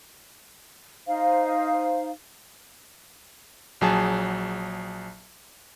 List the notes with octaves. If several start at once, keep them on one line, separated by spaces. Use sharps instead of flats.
D#4 C5 F5
A#1 F#3 G#4 A5